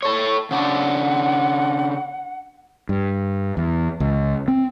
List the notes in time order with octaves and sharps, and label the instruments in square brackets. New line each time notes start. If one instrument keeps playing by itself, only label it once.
[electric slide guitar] A4 C#5
[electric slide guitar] C#3 D4 [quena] F#5
[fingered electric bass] G2
E2
C#2
C4